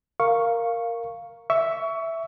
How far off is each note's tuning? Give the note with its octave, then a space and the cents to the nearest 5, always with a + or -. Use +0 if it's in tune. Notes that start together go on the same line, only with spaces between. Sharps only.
A#4 -5 F5 +0 C#6 +0
E5 +0 C#6 +25